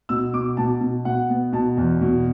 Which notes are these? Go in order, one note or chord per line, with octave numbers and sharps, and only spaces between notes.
B2 E6
B2 D6
B2 A5
B2
B2 F#5
B3
B2 A5
E2
B2